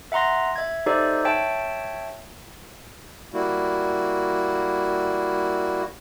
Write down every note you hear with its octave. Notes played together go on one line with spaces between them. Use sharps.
E5 F#5 A#5 C6 A#6
E5 G#6
D#4 G4 A4 C5 D5 E5
C#5 E5 G5 A5
G3 A#3 E4 F#4